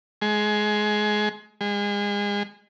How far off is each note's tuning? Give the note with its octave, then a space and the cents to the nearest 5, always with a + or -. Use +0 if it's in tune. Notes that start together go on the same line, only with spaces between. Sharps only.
G#3 +20
G#3 -30